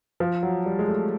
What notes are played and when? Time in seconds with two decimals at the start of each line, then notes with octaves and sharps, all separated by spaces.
0.20 F3
0.43 F#3
0.66 G3
0.79 G#3
0.88 A3